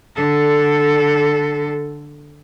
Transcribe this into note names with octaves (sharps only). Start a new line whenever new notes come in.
D3 A4